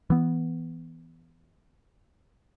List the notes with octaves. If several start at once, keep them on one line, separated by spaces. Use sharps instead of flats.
E3 B3